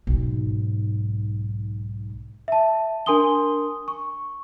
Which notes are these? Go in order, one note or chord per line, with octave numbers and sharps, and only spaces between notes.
B1 G#2
E5 A5
D4 A#4 G#5 C6 D#6 G7
C#6